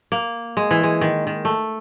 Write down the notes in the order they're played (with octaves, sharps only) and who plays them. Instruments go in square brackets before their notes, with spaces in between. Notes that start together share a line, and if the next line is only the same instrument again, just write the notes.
[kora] A#3
G#3
E3
G#3
D#3
D#3
A3